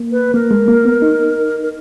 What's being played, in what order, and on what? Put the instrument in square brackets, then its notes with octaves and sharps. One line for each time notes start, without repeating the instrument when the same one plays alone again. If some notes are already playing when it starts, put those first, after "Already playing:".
Already playing: [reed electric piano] A#3
[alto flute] B4
[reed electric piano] A#3 [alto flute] A#4
[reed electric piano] G#3
A#3
B3
D#4
[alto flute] A#4